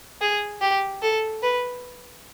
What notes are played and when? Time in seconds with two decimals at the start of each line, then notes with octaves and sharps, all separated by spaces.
0.21 G#4
0.61 G4
1.02 A4
1.43 B4